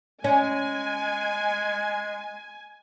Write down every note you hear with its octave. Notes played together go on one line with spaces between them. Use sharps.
G#3 C#4 G#5